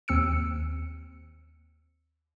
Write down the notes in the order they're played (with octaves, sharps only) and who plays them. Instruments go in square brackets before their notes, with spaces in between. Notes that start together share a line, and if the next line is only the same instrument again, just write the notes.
[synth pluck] D#2 C4 E6 C#7